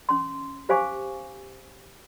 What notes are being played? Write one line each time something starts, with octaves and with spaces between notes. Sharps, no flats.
C#4 C6
G4 C5 F5 G#5 C#6 D6